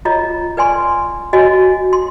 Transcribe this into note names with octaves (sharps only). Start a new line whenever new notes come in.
F4 C#5 D#5 A#5
B4 D5 G#5 C6 C#6
F#4 C#5 D#5 G#5
C6